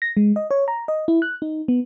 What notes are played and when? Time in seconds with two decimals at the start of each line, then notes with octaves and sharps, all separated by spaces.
0.02 A#6
0.17 G#3
0.36 D#5
0.51 C#5
0.68 A#5
0.88 D#5
1.08 E4
1.22 F#6
1.42 D#4
1.68 B3